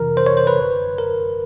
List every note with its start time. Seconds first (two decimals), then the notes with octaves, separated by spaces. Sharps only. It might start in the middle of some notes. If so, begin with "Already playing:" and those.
Already playing: F2 C3 E3 A#4
0.17 C5
0.27 C#5
0.37 C5
0.47 B4
0.57 F#2 D3
0.98 A#4